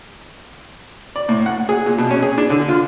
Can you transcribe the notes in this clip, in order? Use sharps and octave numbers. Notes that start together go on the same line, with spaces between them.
D5
A2
F#5
G#4
A#2
B2
C#4
G#4
D4
D3
F4